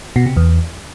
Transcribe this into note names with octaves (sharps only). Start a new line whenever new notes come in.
B2
C3
E2